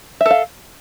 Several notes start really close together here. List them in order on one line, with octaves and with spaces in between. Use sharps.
E5 A4 F5